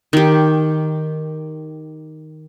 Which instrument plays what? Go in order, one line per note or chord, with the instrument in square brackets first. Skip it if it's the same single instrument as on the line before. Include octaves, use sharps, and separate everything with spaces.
[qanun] D#3 G4